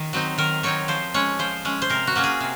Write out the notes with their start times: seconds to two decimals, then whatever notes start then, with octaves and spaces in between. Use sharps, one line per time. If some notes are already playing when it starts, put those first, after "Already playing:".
Already playing: D#3
0.13 F#3 C4 D#4
0.38 D#3 A#4
0.63 F#3 C4 D#4 C#5
0.88 F3 C5
1.14 G#3 C#4 C#5
1.39 F3 C5
1.65 G#3 C#4
1.82 C5
1.90 C3 A#4
2.07 F#4
2.15 F#3 A#3 C#4
2.24 G#4
2.40 C3